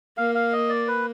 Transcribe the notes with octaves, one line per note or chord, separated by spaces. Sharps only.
A#3 F5
F5
D#5
D5
B4